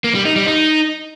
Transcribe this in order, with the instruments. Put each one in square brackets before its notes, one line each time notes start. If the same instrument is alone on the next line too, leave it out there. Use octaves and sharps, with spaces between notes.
[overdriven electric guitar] A#3
G3
D#4
G3
D#4